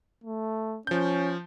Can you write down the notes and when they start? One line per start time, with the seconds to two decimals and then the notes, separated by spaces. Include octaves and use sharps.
0.24 A3
0.87 F3 C#4 G6